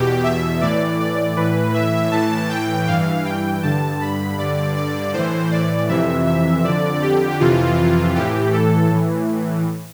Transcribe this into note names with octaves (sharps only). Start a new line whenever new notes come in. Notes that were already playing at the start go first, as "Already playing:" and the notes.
Already playing: E2 B2 G4
E5
A2 E3 D5
D5
A2 E3 B4
E5
A2 E3 A5
G5
G2 E3 F5
G5
G2 D3 A5
B5
G2 D3 D5
D5
A2 E3 C5
D5
F2 C3 E3 E5
E5
F2 D3 D5
G4
F2 C3 E3 F4
A2 E3 G4
A4
A2 E3